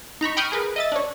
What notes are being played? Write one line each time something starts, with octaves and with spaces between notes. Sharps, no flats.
D#4 A#5 B5 C#6
G5 B5 C#6 D#6 F6 G6
G#4 A#4 B4
D#5 E5 A6
D4 C#5